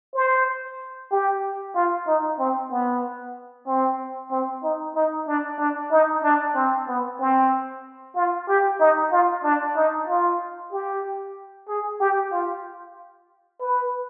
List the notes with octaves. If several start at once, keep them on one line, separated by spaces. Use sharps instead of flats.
C5
G4
F4
D#4
C4
B3
C4
C4
D#4
D#4
D4
D4
D#4
D4
C4
B3
C4
F4
G4
D#4
F4
D4
D#4
F4
G4
G#4
G4
F4
B4